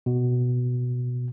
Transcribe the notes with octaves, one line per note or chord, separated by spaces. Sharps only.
B2